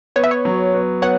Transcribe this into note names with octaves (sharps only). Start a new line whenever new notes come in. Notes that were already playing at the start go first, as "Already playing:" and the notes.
B3 C#5
E5
C#5
F#3
B3
B3 C#5 F#5